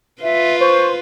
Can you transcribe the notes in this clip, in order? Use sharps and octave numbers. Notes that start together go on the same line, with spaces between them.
F4 B4 E5
C5 C#6